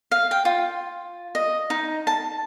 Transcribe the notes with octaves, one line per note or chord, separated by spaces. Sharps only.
F5
G5
F4
D#5
D#4
A5